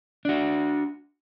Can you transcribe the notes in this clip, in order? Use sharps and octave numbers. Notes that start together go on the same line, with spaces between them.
D4 F#4